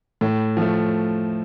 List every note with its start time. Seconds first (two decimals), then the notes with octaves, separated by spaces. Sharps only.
0.21 A2
0.57 F3 A3